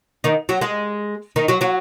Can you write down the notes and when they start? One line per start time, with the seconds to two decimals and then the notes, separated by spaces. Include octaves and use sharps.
0.24 D#3 D#4
0.49 F#3 F#4
0.61 G#3 G#4
1.36 D#3 D#4
1.48 F#3 F#4
1.61 F#3 F#4